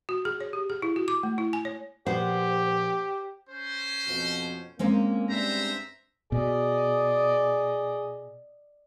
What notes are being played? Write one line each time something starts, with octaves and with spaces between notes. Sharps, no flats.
F#4
G#4
C#5
G4
G#4
E4
F#4
D6
A3
E4
G#5
C#5
A#1 B3 G4 C5 F#5
C#4 C5
F2 B2 F3
G#3 A#3 C4 C#4
G2 C5 E5 A#5
B2 G#4 D5 D#5